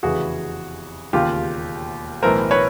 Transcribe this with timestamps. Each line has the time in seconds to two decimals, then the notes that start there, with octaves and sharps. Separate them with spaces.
0.03 F1 E2 C#3 E3 F#4 G#4
1.13 E1 D#2 C#3 F4 G4
2.23 B1 A2 E3 A#4 C5
2.51 B4 C#5